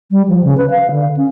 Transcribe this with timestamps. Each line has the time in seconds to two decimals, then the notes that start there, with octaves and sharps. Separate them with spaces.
0.11 G3
0.28 F3
0.44 C#3
0.58 B4
0.71 F5
0.91 D3
1.17 C#4